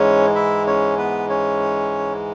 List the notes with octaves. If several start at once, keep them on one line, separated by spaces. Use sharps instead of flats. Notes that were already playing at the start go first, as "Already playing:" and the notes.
Already playing: G#2 E3 G#3 C#4 C#5
E4 E5
C#4 C#5
B3 B4
C#4 C#5